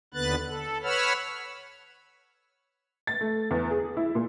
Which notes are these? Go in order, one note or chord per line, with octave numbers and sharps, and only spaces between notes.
D#2 D3 B3 B4 F#6 A6
A4
B4 C#5 F#5 B5 E6 F6
A6
A3
E2
G#4
E4
A#2